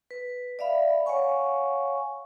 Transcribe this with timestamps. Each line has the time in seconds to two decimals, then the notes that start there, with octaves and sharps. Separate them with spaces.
0.11 B4
0.59 D5 E5 F5 B5
1.06 C#5 F5 F#5 G#5 C#6